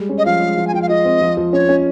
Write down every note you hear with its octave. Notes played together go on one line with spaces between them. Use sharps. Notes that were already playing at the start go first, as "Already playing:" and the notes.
Already playing: G3 G#3
C#4
D#5
F3 F5
G#3
F3
G#5
F3 G5
F5
F4 D#5
C4
F3
F3
C#4 C#5
C#4